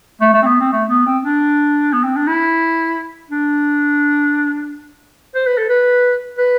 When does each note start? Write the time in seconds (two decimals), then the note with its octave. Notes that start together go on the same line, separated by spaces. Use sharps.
0.21 A3
0.33 A3
0.42 C4
0.46 B3
0.60 C4
0.72 A3
0.90 B3
1.06 C4
1.24 D4
1.93 B3
2.03 C4
2.16 D4
2.27 E4
3.30 D4
5.35 C5
5.46 B4
5.57 A4
5.70 B4
6.38 B4